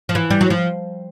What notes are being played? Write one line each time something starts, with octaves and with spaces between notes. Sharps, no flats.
F3
E3
G3
F#3
F3